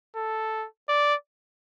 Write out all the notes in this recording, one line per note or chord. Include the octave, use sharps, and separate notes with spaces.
A4
D5